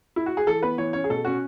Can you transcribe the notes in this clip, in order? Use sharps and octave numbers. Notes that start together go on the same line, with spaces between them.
E4
F#4
G#4
E3 A4
B3 B4
E3 C#5
C#4 C#5
G#4
B2 A4
C#4 F#4